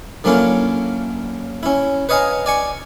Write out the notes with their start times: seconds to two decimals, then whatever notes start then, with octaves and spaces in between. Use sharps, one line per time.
0.24 D3 F#3 A#3 C#4 E4 F4
1.63 C#4 E4
2.09 B4 C#5 D#5 F5 G#5 A#5
2.46 D5 G#5 C#6